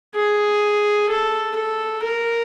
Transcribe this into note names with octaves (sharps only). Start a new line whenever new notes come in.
G#4
A4
A4
A#4